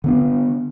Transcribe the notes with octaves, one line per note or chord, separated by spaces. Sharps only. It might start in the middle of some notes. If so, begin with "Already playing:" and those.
D3 B3 D4